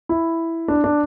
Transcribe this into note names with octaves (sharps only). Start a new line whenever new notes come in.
E4
D4
D4